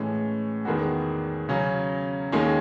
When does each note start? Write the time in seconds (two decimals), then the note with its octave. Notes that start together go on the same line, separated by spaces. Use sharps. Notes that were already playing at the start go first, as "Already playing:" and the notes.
Already playing: A2 E3 G#3 C#4
0.65 E2 D#3 G#3 B3 F#4
1.49 C#3 F#3 C#4
2.32 D#2 D#3 G#3 C#4